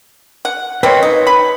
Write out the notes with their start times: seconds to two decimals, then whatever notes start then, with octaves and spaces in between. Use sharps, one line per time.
0.45 F#5
0.83 B2 A#3 C4 B4 C#5
1.03 D#4
1.27 B5